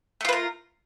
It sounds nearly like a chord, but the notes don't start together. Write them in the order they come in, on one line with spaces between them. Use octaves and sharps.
A3 F4 B4 A#4